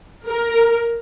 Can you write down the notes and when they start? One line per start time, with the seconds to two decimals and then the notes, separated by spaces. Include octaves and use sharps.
0.25 A#4